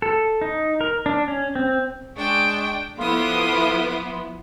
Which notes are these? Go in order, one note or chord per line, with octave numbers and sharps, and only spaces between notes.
A4
D#4
A#4
D4
C#4
C4
G#3 D4 G#4 G5 C#6
F3 B3 E4 A4 F5 C6 D6 D#6